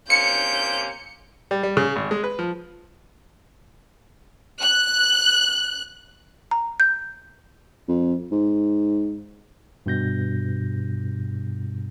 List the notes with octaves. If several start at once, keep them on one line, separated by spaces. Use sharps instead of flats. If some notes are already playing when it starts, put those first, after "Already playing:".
C3 A#3 C#4 G6 C#7
G3
G3
C#3
G#1
G#3
B4
F3
F#6
A#5
G6
F2
G#2
G2 B2 G6 A#6